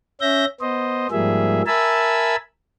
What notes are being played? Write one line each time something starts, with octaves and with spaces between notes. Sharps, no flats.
C#4 E5 G6 A#6
B3 C5 D#5
G#2 F3 G3 A#3 G#4 E5
A#4 E5 G#5 A5 B5 E6